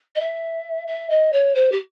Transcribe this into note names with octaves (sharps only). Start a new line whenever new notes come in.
D#5
E5
E5
D#5
C#5
C5
G4